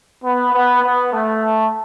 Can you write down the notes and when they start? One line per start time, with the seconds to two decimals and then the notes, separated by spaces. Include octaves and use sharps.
0.24 B3
0.53 B3
0.83 B3
1.13 A3